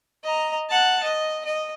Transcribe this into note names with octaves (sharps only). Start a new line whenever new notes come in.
D#5 A#5
F#5 A5
D#5
D#5